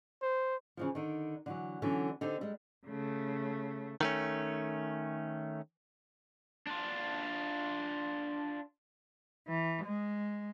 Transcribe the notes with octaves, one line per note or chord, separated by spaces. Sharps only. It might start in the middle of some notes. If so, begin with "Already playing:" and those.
C5
C#3 E3 F3
D3 D#3
D3 E3 F#3
D3 E3 F#3 B3 C#4
D3 C4 D#4 G4
G3 G#3
C#3 A3
D#3 A3 C#4
D4 F4
E3
G#3